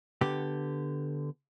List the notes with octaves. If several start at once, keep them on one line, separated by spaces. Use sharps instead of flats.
D3 B3 G4